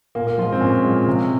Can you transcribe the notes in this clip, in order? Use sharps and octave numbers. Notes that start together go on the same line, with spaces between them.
A#2 A#3
A#3
F3 G#3 F4
C4
A#2 C#4
F3 G#3
C3